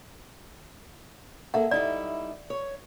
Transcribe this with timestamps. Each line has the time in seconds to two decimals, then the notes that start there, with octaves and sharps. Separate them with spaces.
1.54 A#3 G#4 A4 E5 F#5
1.71 G3 D#4 E4 D5
2.50 C#5